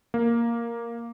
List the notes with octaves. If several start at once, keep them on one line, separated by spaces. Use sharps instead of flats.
A#3